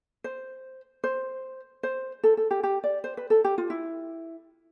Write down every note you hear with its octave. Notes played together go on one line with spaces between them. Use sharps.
C5
C5
C5
A4
A4
G4
G4
D5
C5
B4
A4
G4
F4
E4